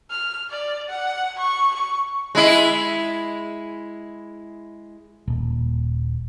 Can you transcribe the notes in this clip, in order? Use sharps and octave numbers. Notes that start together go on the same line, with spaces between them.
F6
D5
F#5
C#6
C#6
G#3 E4
D#1